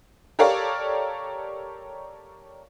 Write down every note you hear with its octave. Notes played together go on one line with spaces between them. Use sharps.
G4 A4 A#4 C#5 D5 F5